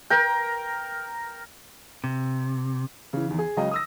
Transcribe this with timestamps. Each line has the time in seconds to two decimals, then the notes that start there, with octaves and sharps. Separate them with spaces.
0.10 A#4 G5
2.04 C3
3.13 C#3 E3
3.27 E2 D#3
3.38 G#4
3.57 C#2 C#3 F#3 D#5 F5 G5
3.71 D#6 E6 A#6